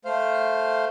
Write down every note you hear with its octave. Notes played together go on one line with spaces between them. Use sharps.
A3 C5 F5